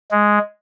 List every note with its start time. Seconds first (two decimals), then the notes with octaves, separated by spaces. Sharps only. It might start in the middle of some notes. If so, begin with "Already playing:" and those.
0.11 G#3